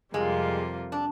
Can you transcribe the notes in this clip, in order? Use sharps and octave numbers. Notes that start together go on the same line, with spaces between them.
F2 C3 G3 G#3 A#3 F4
D4